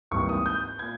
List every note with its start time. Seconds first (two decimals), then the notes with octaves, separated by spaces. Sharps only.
0.11 G#1 G#2 E3 G3 A#3 C#6
0.29 D#6
0.46 G6
0.79 A#2 G#6